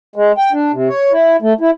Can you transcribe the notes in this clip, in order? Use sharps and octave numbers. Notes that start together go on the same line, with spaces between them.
G#3
G5
D4
C3
C#5
E4
A3
E4